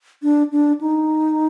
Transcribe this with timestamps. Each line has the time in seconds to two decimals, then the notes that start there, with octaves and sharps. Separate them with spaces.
0.23 D4
0.52 D4
0.81 D#4